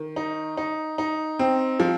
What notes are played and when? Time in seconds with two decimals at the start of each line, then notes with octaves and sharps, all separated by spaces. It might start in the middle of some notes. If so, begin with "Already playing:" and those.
Already playing: D#3
0.16 D#4
0.57 D#4
0.98 D#4
1.39 C4
1.80 F3